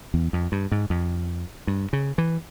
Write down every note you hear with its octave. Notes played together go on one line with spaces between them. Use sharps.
E2
F2
G2
G#2
F2
G2
C#3
E3